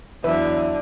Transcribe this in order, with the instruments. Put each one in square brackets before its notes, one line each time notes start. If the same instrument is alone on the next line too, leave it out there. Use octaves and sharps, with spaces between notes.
[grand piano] E2 [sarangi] D3 [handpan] F#3 E4 E5 [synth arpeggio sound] B4